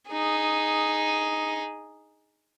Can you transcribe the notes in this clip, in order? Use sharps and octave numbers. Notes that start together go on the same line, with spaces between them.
D#4 G#4